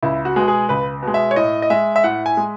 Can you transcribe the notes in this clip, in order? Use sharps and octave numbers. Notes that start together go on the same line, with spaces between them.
C#2 E4
F#4
B2 G#3
G#4
C#2 B4
B2 G#3
E5
C#5
A2 D#5
D#5
G#3 E5
E5
A2 F#5
G#5
G#3